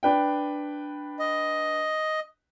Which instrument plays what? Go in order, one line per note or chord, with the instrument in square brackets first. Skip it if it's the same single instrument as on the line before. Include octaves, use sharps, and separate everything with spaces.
[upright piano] D4 B4 G5
[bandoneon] D#5